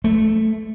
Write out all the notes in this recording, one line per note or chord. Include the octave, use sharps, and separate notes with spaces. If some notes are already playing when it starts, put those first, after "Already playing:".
A3